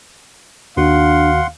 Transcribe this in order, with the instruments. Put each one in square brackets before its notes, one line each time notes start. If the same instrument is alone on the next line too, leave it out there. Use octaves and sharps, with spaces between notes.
[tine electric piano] D#2 D#3 F#4 [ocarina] D4 [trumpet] F5 [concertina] F#5 C6